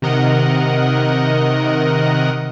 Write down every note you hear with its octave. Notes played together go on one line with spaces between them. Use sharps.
C3 D#3 A#4 D#5 F#5